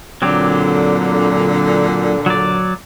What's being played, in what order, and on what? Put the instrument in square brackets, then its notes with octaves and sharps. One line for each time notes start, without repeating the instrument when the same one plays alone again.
[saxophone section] A#2 D3 [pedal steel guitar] F#3 C4 G4
[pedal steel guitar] F#3 D5